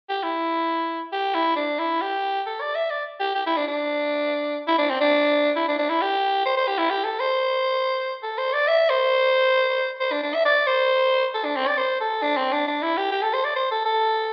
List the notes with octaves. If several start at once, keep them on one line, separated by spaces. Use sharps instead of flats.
G4
E4
G4
E4
D4
E4
G4
A4
D5
E5
D5
G4
G4
E4
D4
D4
E4
D4
C4
D4
E4
D4
D4
E4
G4
C5
C5
G4
E4
G4
A4
C5
A4
C5
D5
E5
C5
C5
D4
D4
E5
D5
C5
A4
D4
C4
D5
C5
A4
D4
C4
D4
D4
E4
G4
G4
A4
C5
D5
C5
A4
A4